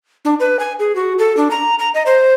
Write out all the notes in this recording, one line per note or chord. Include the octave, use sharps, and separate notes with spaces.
D4
B4
G#5
G#4
F#4
A4
D4
A#5
A#5
D#5
C5